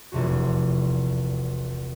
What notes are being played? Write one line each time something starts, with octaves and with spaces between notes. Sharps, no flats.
F1 A#1 E2 C3 F#4